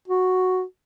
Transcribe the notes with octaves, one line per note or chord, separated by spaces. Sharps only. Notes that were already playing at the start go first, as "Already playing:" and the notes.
F#4